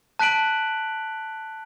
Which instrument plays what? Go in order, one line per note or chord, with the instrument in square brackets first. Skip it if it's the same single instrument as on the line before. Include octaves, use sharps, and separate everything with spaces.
[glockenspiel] A5 F#6 B6 D7 F#7